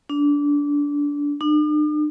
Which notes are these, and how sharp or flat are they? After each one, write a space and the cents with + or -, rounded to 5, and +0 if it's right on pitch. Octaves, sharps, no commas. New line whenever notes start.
D4 -20
D4 +45